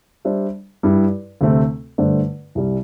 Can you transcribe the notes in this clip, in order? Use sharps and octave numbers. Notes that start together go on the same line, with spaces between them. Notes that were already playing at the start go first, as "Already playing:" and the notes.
G3 D4 C5 E5
G2 G3 E4 G4
D2 C3 A3 C4
G2 D3 A3 D4 C5
C2 C3 G3